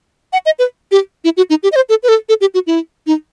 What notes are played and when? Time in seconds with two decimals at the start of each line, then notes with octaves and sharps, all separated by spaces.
0.33 F#5
0.46 D#5
0.59 B4
0.91 G4
1.24 E4
1.37 F#4
1.50 D#4
1.63 G4
1.72 D#5
1.76 C5
1.89 A4
2.03 B4
2.09 A4
2.29 A4
2.41 G4
2.54 F#4
2.67 E4
3.07 D#4